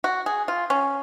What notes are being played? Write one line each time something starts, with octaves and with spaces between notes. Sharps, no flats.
F#4
G#4
F4
C#4